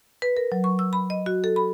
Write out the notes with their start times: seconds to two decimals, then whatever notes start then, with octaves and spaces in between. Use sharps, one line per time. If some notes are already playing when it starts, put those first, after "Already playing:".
0.22 B4
0.37 A#4
0.52 F#3
0.64 C#6
0.79 E6
0.93 B5
1.10 D#5
1.26 F#4
1.44 A4
1.56 B5